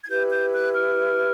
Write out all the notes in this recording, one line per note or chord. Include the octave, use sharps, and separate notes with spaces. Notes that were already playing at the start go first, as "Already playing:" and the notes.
G#6
E4 G4 B4 G6
G6
F#6
F6